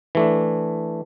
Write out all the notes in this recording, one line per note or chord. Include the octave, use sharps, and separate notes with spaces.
E3 A3 D4